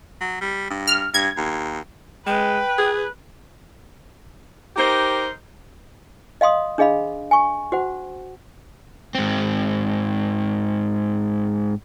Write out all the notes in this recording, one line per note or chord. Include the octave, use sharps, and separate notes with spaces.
F#3
G3
G2
F6
G2 G#6
D#2
G#3 B4 G5
G#4
D#4 G4 A#4 C5
D#5 F5 C6 D#6
D4 G#4 D#5 F5 B5
G#5 C#6
F#4 C5 F#5
G#2 C4